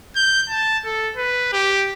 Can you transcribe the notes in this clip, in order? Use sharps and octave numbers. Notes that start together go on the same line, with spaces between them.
G6
A5
A4
B4
G4